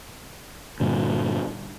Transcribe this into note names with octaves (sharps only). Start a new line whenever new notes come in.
G2 A#2 D3